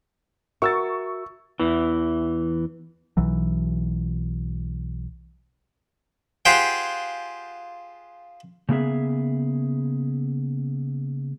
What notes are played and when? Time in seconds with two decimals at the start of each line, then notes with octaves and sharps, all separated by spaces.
0.62 F#4 A#4 E5 C#6 E6 A6
1.60 E2 E3
3.17 B1 E3 F#3
6.45 F4 G4 G#4 C5 F#5 G5
8.69 C#3 A#3 B3 G#4 E5